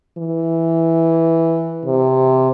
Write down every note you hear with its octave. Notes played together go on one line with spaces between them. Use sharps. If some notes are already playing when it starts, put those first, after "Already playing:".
E3
C3